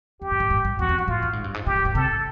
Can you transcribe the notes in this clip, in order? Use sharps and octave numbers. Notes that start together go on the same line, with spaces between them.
F2 G4
G2
A2
G#2
G2
E2 F#4
F2
F#2
A2 F4
A2
G#2
G2
G#2
A#2 G4
A2
G#2
C3 A4